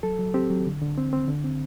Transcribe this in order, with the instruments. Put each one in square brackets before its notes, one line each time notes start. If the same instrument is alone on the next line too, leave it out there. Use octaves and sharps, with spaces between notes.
[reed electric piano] F#3 A4
F#3
C4 G4
F#3
D3
D3
C4
C4
D3
C4